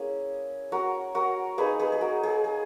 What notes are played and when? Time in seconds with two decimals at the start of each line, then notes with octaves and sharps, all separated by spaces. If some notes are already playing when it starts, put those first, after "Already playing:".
Already playing: A#3 C#4 E4 G#4
0.72 F#4 A#4
1.15 F#4 A#4
1.58 A#3 D#4 G#4 B4
1.79 G#4 B4
1.92 G#4
2.01 F#4 A#4
2.23 G#4
2.44 G#4